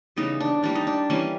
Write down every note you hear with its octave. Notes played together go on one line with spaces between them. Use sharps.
C#3 E3 G3 B3 D#4
D4
E3 G3 A#3 D4
D#4
D4
E3 G3 A#3 C#4